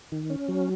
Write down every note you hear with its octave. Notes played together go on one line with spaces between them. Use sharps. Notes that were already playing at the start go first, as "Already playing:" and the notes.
D#3
C#4
F#3